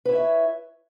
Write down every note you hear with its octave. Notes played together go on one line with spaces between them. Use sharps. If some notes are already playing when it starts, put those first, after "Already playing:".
E4 B4 C#5 E5